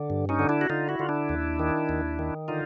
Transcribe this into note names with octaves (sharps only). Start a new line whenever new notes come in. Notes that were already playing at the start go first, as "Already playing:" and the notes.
Already playing: D3
G2
C#4 D#4
D3
D4 E4
F#4
D3 D#4 F4
E4 F#4
D3 F4
D4 E4
D#2
D#3
D#2
D#3
D3 D#4 F4